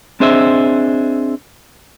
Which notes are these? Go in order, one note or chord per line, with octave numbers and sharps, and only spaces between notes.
C4 D4 G#4 C5 D#5 E5